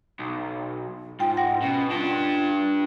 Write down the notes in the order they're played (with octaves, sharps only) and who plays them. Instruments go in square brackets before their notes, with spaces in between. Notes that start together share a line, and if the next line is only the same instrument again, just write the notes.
[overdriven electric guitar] B1
[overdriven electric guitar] G#2 [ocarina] F4 [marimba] G5
[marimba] F#5 G5 A#6
[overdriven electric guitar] B2 [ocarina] C#4
[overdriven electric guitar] D4 G4 [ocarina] F4